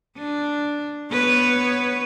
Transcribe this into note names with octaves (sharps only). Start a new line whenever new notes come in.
D4
B3 B4 C#5